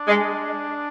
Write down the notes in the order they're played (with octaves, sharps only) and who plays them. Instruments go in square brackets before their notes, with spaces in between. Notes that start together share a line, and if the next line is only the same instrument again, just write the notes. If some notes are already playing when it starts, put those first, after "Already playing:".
Already playing: [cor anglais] D4
[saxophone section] G#3